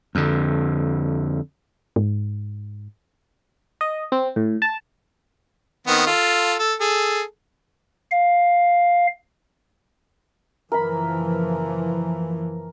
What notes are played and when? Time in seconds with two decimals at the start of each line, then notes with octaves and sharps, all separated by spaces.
0.15 F2 D3
1.96 G#2
3.81 D#5
4.12 C4
4.36 A2
4.62 A5
5.87 D#3 B3 C4
6.07 F4 A4
6.59 A4
6.80 G#4 A4
8.11 F5
10.72 F#1 E3 F3 A#4 B5